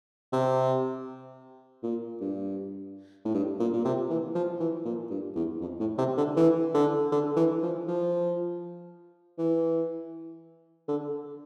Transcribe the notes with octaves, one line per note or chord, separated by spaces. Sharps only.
C3
A#2
G2
A2
G2
A#2
A#2
C3
E3
F3
E3
A#2
G2
E2
F2
A2
C3
D3
E3
D3
D3
E3
F3
F3
E3
D3